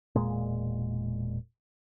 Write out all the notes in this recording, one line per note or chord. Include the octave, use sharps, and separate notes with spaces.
E1 A#2 G#3